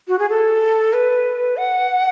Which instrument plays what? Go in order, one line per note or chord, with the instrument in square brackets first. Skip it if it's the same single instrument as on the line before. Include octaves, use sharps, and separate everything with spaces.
[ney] F#4
G#4
A4
B4
F#5